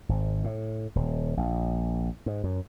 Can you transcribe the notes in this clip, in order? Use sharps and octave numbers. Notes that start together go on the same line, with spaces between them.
G#1
A2
D#1
A#1
G#2
F#2